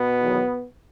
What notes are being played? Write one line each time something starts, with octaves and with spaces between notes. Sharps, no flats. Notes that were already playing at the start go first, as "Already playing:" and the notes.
Already playing: B2 B3
E2 D#3 F#3